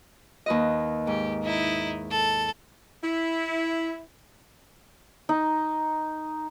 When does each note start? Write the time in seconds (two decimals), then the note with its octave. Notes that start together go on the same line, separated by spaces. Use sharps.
0.46 D#2 B4 D#5
1.07 G#2 G4
1.43 D#4 E4
2.11 A4
3.04 E4
5.29 D#4